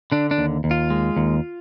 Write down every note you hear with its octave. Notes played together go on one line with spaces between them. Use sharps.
D3 D4
D4
D#2
D#2
F4
G#3
D#2